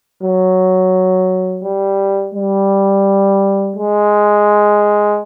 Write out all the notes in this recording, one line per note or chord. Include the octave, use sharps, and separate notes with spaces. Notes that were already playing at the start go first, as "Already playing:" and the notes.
F#3
G3
G3
G#3